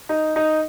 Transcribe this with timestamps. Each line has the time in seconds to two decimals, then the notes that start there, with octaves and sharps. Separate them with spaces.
0.09 D#4
0.36 D#4